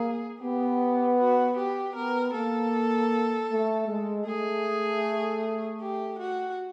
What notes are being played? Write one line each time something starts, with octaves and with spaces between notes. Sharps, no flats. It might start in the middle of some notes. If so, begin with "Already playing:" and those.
Already playing: A#3 G#4
B3 G4
F#4
G4
B3 A#4
A#3 A4
A3
G#3
A3 G#4
G4
F#4